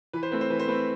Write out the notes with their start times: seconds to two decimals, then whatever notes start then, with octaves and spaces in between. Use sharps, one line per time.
0.13 E3 B4
0.23 C5
0.32 A3 C4 B4
0.41 C5
0.50 E3 B4
0.59 C5
0.68 A3 C4 B4